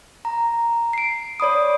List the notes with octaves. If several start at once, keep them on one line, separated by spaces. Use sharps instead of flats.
A#5
C7 D7
C#5 D5 B5 D#6